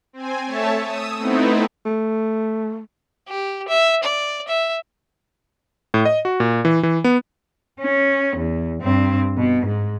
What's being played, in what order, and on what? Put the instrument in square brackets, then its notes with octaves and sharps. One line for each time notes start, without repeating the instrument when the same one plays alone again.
[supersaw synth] C4 G#5
A3 C#5 E5 A5
D#6 E6
A3 B3 C4 D#4 E4
[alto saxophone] A3
[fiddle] G4
E5
D5
E5
[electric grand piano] A2
D#5
F#4
A#2
E3
E3
B3
[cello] C#4
E2
G2 C4
B2
G#2